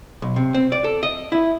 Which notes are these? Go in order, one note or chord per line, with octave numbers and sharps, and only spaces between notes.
B1
C3
C4
D5
A4
D#5
E4